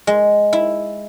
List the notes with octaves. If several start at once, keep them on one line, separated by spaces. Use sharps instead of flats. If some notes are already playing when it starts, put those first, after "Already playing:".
G#3
E4